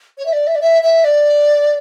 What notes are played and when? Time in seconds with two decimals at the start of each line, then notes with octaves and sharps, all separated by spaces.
0.18 C#5
0.26 E5
0.33 D5
0.47 E5
0.55 D5
0.61 E5
0.83 E5
1.04 D5